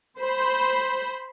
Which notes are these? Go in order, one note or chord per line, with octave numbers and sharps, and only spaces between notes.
C5 B5